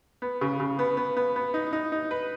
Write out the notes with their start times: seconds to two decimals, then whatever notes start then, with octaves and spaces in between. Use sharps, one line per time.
0.22 B3
0.41 C#3
0.60 C#3
0.79 B3
0.97 B3
1.17 B3
1.36 B3
1.54 D#4
1.73 D#4
1.92 D#4
2.11 B4